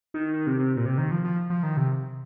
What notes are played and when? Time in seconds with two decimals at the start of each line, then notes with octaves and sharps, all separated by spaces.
0.14 D#3
0.33 D#3
0.47 C3
0.59 C3
0.77 A#2
0.86 C3
0.98 D#3
1.11 F3
1.24 F3
1.50 F3
1.63 D#3
1.77 C3